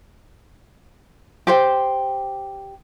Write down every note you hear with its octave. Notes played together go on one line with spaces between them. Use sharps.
G4 C5 G5